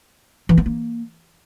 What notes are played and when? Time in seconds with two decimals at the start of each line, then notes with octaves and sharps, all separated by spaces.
0.49 E3
0.57 B3
0.66 A#3